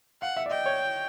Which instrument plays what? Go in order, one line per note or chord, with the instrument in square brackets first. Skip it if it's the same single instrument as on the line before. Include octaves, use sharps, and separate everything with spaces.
[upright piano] F5 [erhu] F#5
[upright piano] E5
D5
[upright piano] D#5 [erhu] G5
[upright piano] C#5